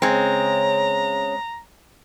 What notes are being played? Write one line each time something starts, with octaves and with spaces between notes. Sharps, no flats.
C#3 G#3 C4 A#5